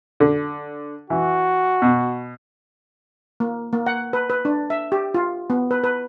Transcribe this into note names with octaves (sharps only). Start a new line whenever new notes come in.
D3
E3 F#4
B2
A#3
A#3
F#5
B4
B4
D4
E5
G4
F4
B3
B4
B4